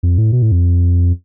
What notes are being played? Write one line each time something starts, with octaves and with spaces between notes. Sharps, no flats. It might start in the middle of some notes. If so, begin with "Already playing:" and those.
F2
A2
B2
A2
F2